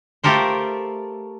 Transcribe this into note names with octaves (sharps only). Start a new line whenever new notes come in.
A3 F4 G4 A4 A#4 C5